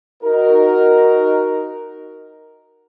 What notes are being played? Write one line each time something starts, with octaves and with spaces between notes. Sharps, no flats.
D#4 F#4 A#4